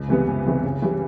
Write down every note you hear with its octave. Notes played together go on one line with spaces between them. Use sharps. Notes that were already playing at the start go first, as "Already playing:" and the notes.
Already playing: C#2
C3 E3 G3 B3
C#2
C3 E3 G3 B3
C#3
E3 G3